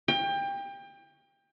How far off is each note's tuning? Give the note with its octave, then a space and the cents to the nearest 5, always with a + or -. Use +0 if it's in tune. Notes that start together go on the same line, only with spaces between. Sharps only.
G5 +25